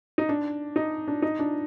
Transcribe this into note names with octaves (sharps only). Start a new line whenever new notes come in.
D#4
D4
D#4
D4
D#4
D4